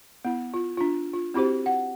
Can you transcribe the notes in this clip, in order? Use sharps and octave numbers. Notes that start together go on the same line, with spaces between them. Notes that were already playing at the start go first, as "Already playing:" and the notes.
B3 E4
F4
D4 F4
F4
C4 E4 F#4 G4 C5
F#5